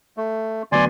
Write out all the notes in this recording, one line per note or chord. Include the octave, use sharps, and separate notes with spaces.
A3
D2 F#3 B3 D5 G#5 C6